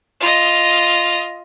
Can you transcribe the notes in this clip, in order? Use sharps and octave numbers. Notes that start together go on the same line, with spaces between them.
F4 D#5